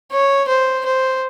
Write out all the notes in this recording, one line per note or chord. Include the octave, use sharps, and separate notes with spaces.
C#5
C5
C5